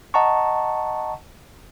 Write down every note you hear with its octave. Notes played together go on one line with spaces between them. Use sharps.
D#5 F#5 A5 A#5 C#6